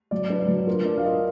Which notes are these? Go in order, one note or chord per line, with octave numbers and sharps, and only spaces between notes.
F#3 D5
D4 B4
D5
F#3
F4 A#4
D4 D5
F5
F4 D#5